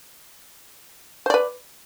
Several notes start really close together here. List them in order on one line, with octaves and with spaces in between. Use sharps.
C5 D5 B4